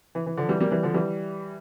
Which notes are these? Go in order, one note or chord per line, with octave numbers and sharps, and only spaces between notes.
E3
E3
D3 F3
E3 G3
G3 A#3
E3 G3
D3 F3
E3 G3